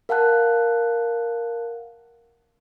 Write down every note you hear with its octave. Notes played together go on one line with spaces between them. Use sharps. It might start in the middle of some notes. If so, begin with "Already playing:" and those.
A#4 F5 F#5 A5 F#6